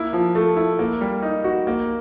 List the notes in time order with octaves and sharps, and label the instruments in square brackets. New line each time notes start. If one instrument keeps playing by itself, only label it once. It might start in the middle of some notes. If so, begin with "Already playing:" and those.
Already playing: [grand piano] A#3 E4
F3
A3
E4
A#3
G3
D#4
F#4
A#3